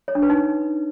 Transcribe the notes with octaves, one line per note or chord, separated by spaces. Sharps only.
C#5
D4
B4
D#4